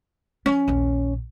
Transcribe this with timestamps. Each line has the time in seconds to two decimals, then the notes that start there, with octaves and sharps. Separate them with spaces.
0.46 F3 C#4
0.68 A#1 D#2